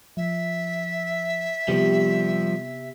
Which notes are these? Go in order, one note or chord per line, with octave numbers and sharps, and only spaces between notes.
F3 E5
C3 F3 G3 B3 G4